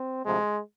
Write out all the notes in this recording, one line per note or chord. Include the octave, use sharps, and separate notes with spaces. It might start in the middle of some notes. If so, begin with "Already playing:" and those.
Already playing: C4
D2 C3 F3 G#3